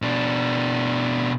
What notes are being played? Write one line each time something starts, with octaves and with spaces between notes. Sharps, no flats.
B2 D4